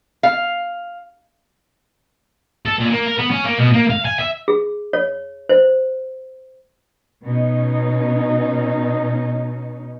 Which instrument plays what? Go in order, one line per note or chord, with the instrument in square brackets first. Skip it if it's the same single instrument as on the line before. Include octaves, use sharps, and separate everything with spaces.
[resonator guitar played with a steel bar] F5
[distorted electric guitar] A4
A#2
A#3
A#4
B3
C#4
A#3
B2
A#3
F5
G#5
E5
[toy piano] G#4
C#5
C5
[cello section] B2 C#4 D#4